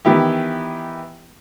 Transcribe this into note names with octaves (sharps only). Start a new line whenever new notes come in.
D#3 E3 B3 E4 G4